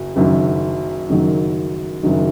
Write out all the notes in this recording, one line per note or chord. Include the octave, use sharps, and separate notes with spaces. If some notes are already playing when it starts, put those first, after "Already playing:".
Already playing: F#1 F#3
F#1 F#2 D#3 F#3
F#1 F#2 D#3 F#3
F#1 F#2 D#3 F#3